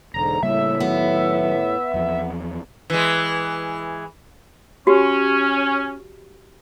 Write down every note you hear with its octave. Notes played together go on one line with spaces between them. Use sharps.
E1 G#2 D3 A#5
A2 C#3 G3 A#3 E5
D#3 F#3 B3
E2 F3
E3 G#3
C#4 F#4 G4